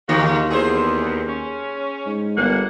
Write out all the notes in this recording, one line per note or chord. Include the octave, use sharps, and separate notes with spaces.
D#2 G#2 D3 A3 D#4 F4 F#4
E2 G#4 C5
C#4
G#2
G1 G2 A#3 F#5